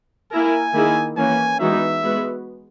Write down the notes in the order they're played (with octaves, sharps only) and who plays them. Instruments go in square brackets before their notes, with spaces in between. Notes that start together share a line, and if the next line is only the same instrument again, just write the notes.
[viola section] A#3 E4 A#4 [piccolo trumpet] G#5
[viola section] D#3 A#3 E4 G#4
[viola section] E3 A#3 C#4 [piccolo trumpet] G#5
[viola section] E3 G#3 B3 D#4 F#4 [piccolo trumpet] E5
[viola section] G#3 B3 F#4 B4